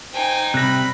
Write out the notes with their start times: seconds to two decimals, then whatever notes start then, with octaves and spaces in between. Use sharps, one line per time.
0.12 D#4 C5 G5 G#5
0.54 C3 G3 B5 F#6 A#6